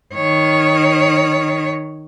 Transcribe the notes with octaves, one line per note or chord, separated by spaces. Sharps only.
D#3 C#5